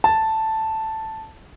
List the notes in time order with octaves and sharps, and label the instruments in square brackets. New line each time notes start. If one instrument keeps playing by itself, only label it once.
[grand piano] A5